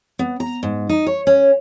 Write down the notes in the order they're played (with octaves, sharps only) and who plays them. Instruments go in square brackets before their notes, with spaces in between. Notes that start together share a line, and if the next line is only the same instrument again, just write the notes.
[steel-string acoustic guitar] B3
A#5
G#2
D#4
C#5
C#4